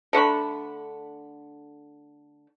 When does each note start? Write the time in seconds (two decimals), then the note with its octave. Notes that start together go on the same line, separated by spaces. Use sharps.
0.13 D3 A3 D4 B5